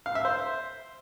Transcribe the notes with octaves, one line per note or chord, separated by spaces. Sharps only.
F5
E5
C5